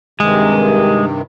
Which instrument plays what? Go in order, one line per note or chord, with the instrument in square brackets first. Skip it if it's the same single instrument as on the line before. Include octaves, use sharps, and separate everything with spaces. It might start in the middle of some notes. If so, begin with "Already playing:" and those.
[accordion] G2 C3 D#3 [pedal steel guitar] G#3